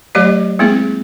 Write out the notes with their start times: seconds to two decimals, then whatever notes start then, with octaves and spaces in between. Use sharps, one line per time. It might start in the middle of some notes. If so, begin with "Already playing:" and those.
0.15 F#3 A3 G4 C#5 D#5
0.59 G#3 A#3 C4 E4 G#4